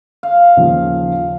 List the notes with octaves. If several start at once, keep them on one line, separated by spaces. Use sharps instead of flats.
F5
D#2 C#3 F3